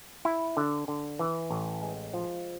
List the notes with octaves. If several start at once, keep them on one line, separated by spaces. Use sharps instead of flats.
E4
D3
D3
E3
A1
G#3
F3